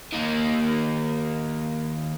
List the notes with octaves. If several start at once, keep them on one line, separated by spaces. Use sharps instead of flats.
D#3 A#3